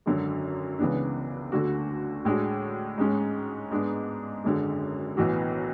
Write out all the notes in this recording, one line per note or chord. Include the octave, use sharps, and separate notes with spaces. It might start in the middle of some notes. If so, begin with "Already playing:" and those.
G#1 F#2 D3 F#3
C#2 C#3 E3 B3 D4
D2 D3 A3 D4 F#4
A2 G#3 D4 F#4
G#2 G#3 C#4
G#2 G#3 B3 D4
G#1 F#2 D3 G#3
B1 A2 E3 B3 F#4